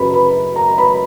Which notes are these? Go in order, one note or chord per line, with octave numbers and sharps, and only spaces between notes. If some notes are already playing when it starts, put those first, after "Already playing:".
Already playing: F#2 C#3 F#3 A#4 B4 B5
B4 B5
A#4 A#5
B4 B5